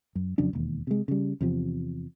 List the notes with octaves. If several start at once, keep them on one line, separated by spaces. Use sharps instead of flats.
F#2
F2 C#3 F#3 D4
E1 D#2
C3 G#3
C#3 G3
E2 C3 F3